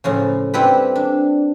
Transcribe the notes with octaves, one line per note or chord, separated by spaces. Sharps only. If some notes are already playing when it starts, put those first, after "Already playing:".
A2 C#3 F3
G3 C4 E4 G4 A4 B4
D4